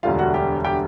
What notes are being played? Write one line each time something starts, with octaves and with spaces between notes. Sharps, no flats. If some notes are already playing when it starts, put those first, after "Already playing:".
E1 D2 D3 G3 F4 F5
F#4 F#5
G4 G5
G4 G5